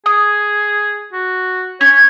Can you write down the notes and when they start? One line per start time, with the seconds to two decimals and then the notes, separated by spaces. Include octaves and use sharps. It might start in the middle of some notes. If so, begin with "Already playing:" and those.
0.06 G#4 D#6
1.13 F#4
1.81 C#4 C#5 G#6